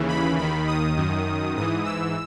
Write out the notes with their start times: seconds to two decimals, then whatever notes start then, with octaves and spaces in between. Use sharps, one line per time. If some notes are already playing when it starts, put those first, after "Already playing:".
Already playing: D#2 C#3 E3
0.08 B5
0.37 D#2 D#3 B5
0.67 D#6
0.96 F#2 D#3
1.56 G#2 E3 D#6
1.85 E6